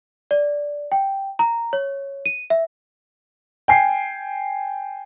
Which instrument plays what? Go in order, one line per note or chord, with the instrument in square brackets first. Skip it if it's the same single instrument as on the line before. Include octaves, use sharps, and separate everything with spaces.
[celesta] D5
G5
A#5
C#5
D#7
E5
[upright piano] G5 G#5 C7